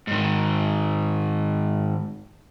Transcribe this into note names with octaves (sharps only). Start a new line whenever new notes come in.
G#2 D#3